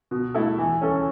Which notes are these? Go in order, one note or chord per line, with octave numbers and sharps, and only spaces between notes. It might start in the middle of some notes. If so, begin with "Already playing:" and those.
B2
A3 E4 A4
E3
C#4 A4